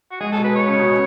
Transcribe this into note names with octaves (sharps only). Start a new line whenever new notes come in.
F#4
G#3 G#4
A4
B2
B4
C#5
C#3
B2